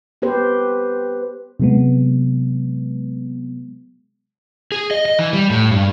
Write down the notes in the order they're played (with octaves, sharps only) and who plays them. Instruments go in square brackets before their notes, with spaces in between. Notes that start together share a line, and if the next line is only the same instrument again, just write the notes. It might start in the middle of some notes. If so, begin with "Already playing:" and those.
[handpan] B3 G4 B4 C5
[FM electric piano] C3 F#3 G#3 B3
[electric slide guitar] G#4
D#5
D#5
E3
G3
A2
G2